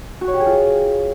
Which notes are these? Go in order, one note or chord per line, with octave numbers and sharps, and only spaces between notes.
F#4
C#5
G4
G#4
F4